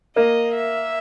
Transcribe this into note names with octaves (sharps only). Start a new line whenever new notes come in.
A#3 D#5
E5